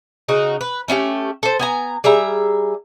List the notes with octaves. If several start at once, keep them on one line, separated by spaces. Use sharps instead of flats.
C#3 D#4 F#4
B4
A3 C#4 E4 G4
A4 C5
B3 G#5 A#5
G3 G#4 E5 A#5